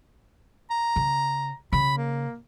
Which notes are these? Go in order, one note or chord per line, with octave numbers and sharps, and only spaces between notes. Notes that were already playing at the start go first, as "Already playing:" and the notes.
A#5
C#3
C#3 B5
A#3